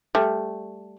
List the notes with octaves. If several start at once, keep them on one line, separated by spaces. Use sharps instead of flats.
G3 A3